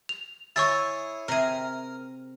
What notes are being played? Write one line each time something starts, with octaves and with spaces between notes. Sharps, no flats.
F7
E4 G#4 C#5 C#6 E6 A6
C3 G#4 A#4